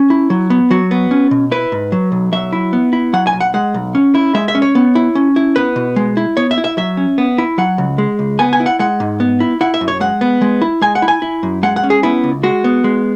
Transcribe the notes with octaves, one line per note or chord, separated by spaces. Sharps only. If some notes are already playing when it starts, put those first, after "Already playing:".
Already playing: C#4
E4
F#3
B3
F#3 F#4
B3
C#4
B2
E4 B4
G#2
F#3
B1
F#3 E5
E4
B3
E4
F#3 F#5
G#5
B1
F#5
G#3 F#5
B1
C#4
E4
G#3 E5
E5
C#4
C#5
B3
E4
C#4
E4
B3 B4
B2
G#3
E4
B3 C#5
E5
E4
E5
F#3 E5
C#4
B3
E4
F#3 F#5
C#2
G#3
C#2
B3 G#5
G#5
E4
F#5
G#3 F#5
G#2
B3
E4
E4 F#5
E5
F#2
C#5
G#3 F#5
B3
G#3
E4
G#3 G#5
F#5
E4
G#5
E4
F#2
G#3 F#5
F#5
C#4
G#4
B3 E4
C#2
G#3 F#4
B3
G#3